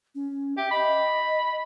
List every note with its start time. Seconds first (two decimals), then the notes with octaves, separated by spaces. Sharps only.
0.15 C#4
0.57 G4 E5
0.71 D#5 B5